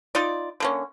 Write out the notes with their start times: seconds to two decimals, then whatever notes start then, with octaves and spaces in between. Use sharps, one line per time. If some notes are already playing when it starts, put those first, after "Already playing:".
0.15 D#4 F4 D5
0.60 D3 A#3 C#4